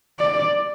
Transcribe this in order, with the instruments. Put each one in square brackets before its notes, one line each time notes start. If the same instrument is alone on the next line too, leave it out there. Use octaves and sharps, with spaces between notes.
[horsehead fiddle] D5